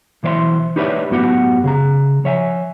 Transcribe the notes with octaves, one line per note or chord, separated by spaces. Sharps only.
B1 E3 C5 D5 E5 C6
D#4 G4 B4 C#5 D5 E5
F#2 A2 B3 F#4 G4 F#5
C#3 G#4 A#5
F3 C#5 E5 F5 G#5